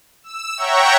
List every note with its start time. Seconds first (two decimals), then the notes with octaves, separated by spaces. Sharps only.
0.24 E6
0.57 C#5 E5 F#5 G5 A#5 C#6